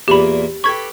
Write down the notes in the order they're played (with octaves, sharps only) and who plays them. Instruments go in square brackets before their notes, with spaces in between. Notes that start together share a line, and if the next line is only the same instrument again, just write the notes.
[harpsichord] E2 A#2 [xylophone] G4 B5
[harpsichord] G4 A4 B4 [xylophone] C#6 G#6